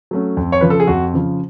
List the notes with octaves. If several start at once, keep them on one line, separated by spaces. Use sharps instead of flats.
F#3 A3 C#4
F2
C#5
C#3 F3 B4
A4
G#4
F2 F#4
C#3 F3